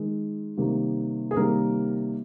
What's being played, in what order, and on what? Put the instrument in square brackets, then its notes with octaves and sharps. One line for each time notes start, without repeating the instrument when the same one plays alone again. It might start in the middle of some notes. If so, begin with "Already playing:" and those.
Already playing: [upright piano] D#3 G#3
C3 D#3 G3 A#3
G#4
C3 D#3 G3 A#3 A#4